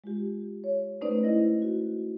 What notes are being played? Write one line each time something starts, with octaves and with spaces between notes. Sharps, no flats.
G#3 F4 G4
C#5
A3 C#4 D#4 B4 C5 D5
E4 D#5 A#6
F#4